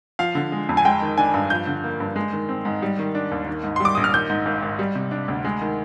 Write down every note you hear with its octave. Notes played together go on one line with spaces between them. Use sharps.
F3 F5
D3
G#3
F2
G#5
G#3 G5
D#3
D4 G#5
G2
F3 G6
D3
A#3
G2
G#3
D#3
C4
G#2
G3
D#3
D4
D#2
D#3
G#2
G3 C6
D6
A#1 D#6
F6
D#3 G6
G#2
G#1
G#1
G3
C3
D4
D2
G#3
D#3